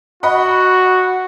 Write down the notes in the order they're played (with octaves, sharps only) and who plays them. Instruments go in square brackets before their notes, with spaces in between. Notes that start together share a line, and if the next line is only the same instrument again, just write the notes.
[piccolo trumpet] F#4 [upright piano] D#5 F#5 B5